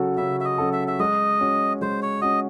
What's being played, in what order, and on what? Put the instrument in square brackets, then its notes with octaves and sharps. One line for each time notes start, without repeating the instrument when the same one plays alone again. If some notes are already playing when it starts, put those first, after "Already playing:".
Already playing: [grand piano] C#3 F#3 C#4 F#4 A4
[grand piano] C#3 [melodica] E5
[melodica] E5
D#5
[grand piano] F#3 C#4 F#4 A4
[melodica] E5
E5
[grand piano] G#3 [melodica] D#5
[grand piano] C#4 F#4
[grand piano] G#3 [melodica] C5
[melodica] C#5
[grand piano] C#4 F#4 [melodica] D#5